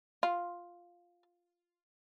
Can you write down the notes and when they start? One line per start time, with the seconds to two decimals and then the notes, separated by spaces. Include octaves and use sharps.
0.23 F4